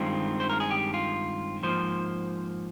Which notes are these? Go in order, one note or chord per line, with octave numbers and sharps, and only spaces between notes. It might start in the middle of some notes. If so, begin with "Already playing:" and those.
Already playing: G2 D#3 G#3 C4 F4
C5
A#4
G#4
G4
F4
G#2 F3 A#3 C5